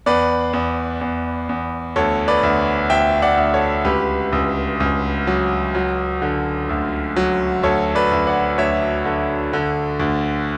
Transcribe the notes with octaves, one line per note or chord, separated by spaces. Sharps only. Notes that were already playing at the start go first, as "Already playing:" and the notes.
E2 B4 D5
E2
E2
E2
D2 A4 C#5
B4 D5
D2
D2 E5 G5
D5 F#5
D2
A4 C#5
C#2 G4 B4
C#2
C#2
F#3
F#3
D3
D2
F#3
D2 A4 C#5
B4 D5
D2
D5 F#5
D2 C#5 E5
D3
D3
D2